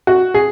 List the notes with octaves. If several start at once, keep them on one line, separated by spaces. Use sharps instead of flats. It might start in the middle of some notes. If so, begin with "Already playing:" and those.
F#4
G#4